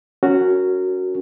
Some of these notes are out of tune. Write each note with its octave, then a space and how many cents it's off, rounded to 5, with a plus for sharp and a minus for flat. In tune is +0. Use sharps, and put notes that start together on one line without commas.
C#4 +0 F#4 +0 A#4 -20